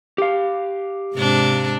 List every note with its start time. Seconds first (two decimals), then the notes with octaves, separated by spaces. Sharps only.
0.18 G4 F5
1.14 G#2 C3 D4